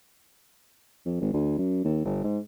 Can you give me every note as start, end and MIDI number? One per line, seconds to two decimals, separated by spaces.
1.05 1.19 41
1.21 1.29 32
1.33 1.57 38
1.58 1.79 42
1.84 2.02 39
2.05 2.21 31
2.24 2.39 44